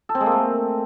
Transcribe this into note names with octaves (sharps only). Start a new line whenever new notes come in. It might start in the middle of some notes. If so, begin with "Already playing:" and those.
A4
C4
G#3
A#3
A3